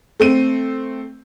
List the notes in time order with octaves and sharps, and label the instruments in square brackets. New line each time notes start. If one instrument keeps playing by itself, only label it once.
[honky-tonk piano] A3 C4 D#7